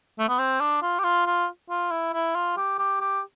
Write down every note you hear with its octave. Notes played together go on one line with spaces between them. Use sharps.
A3
B3
C4
D4
F4
G4
F4
F4
F4
E4
E4
F4
G4
G4
G4